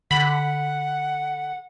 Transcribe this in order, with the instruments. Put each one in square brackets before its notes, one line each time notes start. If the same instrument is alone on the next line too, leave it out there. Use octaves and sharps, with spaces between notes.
[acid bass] D3 [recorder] F#5 [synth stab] B5